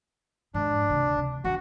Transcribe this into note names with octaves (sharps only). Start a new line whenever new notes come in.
F2 G#2 D4
D2 C3
C3
D4 F#4